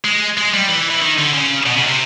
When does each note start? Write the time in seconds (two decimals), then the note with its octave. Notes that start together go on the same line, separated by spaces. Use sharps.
0.04 G#3
0.37 G#3
0.54 G3
0.69 E3
0.90 E3
1.01 D#3
1.18 D3
1.34 C#3
1.66 B2
1.76 C#3
1.87 C3